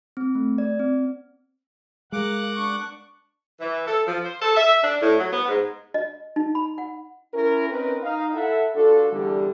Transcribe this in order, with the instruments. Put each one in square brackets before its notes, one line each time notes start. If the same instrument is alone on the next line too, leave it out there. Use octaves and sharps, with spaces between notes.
[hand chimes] C4
A3
D5
C4
[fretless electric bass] G#3 [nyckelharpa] A#4 F5 [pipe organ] F#5 D6 F#6
[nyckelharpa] D4 C#6
[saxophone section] E3
A4
F3
C5
A4
E5
D4
A2
F#3
B3
G#2
[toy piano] D#5
D#4
B5
F#5
[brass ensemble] C#4 E4 A#4
C4 C#4 D#4 A#4 B4
D#4 F5
E4 A4 E5 F#5
G2 D4 F4 F#4 A4
E2 D3 G3